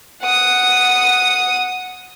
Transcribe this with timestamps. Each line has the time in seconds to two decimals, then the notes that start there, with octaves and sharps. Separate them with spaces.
0.22 F#5 D#6